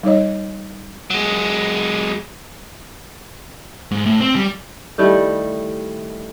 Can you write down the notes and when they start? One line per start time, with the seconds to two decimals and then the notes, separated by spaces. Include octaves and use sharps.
0.03 G3 D#4 C#5 D#5
1.10 F#3 G#3
3.91 G#2
4.06 A2
4.21 C4
4.35 G3
4.98 D#3 G3 A3 E4